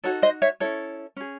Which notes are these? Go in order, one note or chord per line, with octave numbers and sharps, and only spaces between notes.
D#4 F#4 A4 C#5
C5 D#5
C#5 E5
C#4 E4 A4 C#5
C#4 G#4